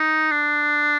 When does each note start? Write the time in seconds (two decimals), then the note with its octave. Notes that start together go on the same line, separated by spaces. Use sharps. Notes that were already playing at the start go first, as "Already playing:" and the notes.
Already playing: D#4
0.31 D4